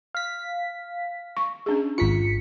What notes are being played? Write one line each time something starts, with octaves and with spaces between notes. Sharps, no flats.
F5 B6
C#6
C#4 D4 G#4
G#1 F4 A#5 B6 C#7